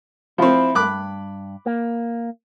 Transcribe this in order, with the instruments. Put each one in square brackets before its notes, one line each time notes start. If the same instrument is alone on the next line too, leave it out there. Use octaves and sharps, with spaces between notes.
[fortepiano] F3 C4 [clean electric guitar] E4
[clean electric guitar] G2 [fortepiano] B5 D6 F#6
[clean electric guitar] A#3